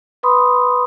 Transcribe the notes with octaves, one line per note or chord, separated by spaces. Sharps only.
B4 B5 C6 D#6